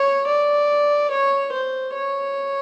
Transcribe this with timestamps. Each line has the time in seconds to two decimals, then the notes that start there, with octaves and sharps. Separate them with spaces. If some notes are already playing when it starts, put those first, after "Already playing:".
Already playing: C#5
0.27 D5
1.11 C#5
1.53 C5
1.94 C#5